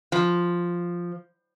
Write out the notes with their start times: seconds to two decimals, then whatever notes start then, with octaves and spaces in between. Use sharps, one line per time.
0.12 F3